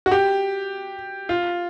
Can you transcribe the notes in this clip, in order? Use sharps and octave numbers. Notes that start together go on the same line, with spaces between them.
F#4
G4
F4